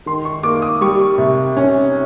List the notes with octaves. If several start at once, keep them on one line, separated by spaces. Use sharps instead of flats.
D#3 C6
C#6
A#3 D6
D#6
G3 C#6
C3
C#4